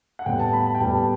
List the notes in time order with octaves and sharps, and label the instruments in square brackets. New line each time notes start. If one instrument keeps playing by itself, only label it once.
[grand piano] F#5
A2 G3 B3 G5
A5
B5
A5
G5
A2 G3 B3 A5